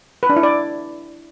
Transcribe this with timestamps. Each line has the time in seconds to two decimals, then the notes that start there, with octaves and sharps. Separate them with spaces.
0.23 B4
0.30 D4
0.36 E4
0.43 D5